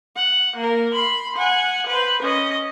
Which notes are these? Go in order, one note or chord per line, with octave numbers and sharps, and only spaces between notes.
F#5
A#3 A#4
B5 C6
F#5 G#5
B4 C5
C#4 D#5